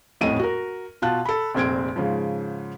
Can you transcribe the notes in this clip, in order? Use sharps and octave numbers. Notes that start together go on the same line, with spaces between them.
D#1 F2 A2 D#5 D#7
F#4 A#4
B2 F4 A5 F#6
A4 B5
F1 A#1 C4 C6 G#6 D7
G#2 C#3 F3